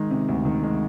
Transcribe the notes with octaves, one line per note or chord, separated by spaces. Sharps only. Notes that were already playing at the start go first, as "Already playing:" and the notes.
Already playing: D#3 G#3
C3
D2
D#3
G#3